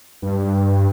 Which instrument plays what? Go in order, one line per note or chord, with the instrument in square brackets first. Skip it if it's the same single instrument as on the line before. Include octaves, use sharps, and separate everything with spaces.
[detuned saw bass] G2